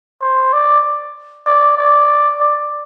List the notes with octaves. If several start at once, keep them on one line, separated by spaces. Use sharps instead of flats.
C5
D5
D5
D5
D5